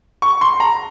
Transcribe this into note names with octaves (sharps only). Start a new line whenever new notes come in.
C#6
C6
A#5